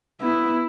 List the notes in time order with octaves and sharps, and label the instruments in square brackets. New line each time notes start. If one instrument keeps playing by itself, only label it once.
[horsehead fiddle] B3 [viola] E4